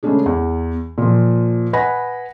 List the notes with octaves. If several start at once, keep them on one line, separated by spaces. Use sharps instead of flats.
C#3 G#3 A3 C#4 D4 G#4
E2
A#2 F3
B4 D#5 F#5 G#5 B5 A#6